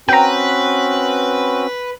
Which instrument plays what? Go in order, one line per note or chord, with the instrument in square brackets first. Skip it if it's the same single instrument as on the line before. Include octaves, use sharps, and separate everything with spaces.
[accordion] C4 C#4 F#4 [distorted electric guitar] B4 [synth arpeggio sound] G5 A#5